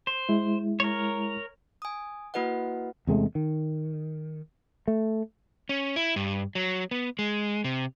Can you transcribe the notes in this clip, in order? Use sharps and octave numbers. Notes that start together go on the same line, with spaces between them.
C5
G#3 E4
A#4 C#5
G#5 D#6
A#3 E4 F#4 B4 D#5 F#5
E2 C3 G#3 A3
D#3
A3
C#4
E4
G2
F#3
B3
G#3
C3